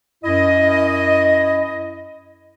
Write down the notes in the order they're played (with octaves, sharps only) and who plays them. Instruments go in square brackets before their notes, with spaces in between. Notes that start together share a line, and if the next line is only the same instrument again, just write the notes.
[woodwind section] F#2 E4 D#5